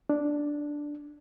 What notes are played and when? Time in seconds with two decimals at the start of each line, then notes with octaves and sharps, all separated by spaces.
0.10 D4